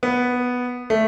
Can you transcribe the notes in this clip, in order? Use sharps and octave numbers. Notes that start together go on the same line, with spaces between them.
B3
A3